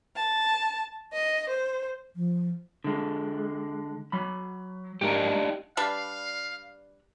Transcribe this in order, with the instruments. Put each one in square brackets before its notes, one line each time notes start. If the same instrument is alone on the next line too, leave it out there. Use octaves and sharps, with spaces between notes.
[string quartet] A5
D#5
C5
[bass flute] F3
[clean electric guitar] D3 G#3
F#3 B5
[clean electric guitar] G#2 A#4 [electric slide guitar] D4 D#4 G4
[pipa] G3 D4 B4 [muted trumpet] F5